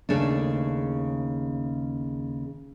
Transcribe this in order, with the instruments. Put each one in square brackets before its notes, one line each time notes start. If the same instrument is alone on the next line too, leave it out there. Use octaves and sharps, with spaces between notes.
[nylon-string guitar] D#2 C#3 A3 D4